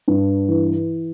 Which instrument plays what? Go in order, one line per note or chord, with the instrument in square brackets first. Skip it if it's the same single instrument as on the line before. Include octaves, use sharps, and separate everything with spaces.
[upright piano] G2
E3